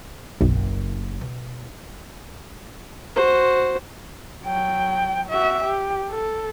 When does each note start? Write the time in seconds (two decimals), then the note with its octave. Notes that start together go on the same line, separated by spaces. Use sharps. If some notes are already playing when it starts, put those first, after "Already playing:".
0.41 F#1 B1
1.21 B2
3.16 F#4 C5
4.45 F#3 G5
5.29 F#4 E5
5.64 G4
6.10 A4